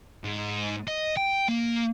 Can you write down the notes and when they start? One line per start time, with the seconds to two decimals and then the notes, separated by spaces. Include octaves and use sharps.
0.24 G#2
0.88 D#5
1.17 G5
1.48 A#3